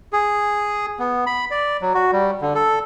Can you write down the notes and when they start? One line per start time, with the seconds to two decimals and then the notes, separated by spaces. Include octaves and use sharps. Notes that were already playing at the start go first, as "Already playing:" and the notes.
0.13 G#4
0.99 B3
1.27 B5
1.51 D5
1.81 F#3
1.94 F#4
2.13 G3
2.41 D3
2.55 A4